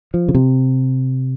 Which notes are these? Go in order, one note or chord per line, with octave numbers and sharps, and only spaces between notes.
F3
C#3
C3